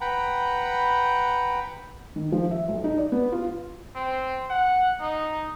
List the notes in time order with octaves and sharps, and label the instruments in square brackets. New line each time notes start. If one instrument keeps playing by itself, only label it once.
[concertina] B4 F#5 G5 A#5 B5
[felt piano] D#3
F3
E5
B1
D#4
D5
B3
F4
[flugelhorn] C4
F#5
D#4